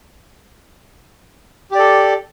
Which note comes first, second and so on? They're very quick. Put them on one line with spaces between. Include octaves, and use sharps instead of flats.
G4 D5 A4